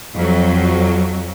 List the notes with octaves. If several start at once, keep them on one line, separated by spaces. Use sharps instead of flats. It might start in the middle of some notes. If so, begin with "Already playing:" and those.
F2 F#3